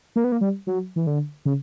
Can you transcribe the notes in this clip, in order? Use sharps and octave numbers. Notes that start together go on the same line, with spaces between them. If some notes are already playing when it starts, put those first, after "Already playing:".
A#3
B3
A#3
G3
F#3
E3
D3
C#3